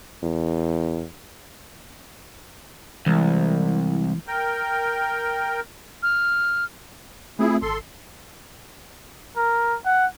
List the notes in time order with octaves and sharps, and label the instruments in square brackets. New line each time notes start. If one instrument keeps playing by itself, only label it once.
[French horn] E2
[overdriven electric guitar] C2 [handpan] E3 G#3
[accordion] A#4 G5
[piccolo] F6
[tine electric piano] A3 C4 F4 [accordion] E4 G#4
[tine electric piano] G#1 [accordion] A4 C6
[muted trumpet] A#4
F#5